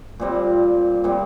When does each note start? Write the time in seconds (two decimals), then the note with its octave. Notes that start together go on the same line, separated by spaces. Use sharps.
0.20 A#2 G3 C4
1.04 A#2 G3 C4